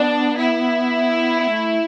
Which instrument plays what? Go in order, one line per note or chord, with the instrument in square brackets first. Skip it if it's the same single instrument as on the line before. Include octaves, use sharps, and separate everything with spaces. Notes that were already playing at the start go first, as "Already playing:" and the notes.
Already playing: [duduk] B3 [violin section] D4
[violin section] E4
[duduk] A3